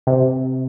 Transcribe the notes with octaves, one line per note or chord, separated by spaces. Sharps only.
C3